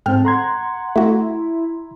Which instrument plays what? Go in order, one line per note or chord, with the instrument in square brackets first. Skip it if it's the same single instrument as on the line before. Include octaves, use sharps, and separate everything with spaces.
[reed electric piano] G#2 C4 [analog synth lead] A4 [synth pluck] G5 F6
[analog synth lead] F#5 [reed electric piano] A#5 C6 G#6
[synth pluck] A3 F#4 [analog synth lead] E4